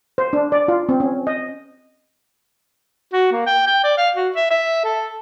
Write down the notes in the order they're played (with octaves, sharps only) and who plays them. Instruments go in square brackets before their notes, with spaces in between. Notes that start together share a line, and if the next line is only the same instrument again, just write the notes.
[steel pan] C5
D4
D5
F4
C4
C#4
D#5
[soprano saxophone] F#4
A#3
G5
G5
D5
F5
F#4
E5
E5
A4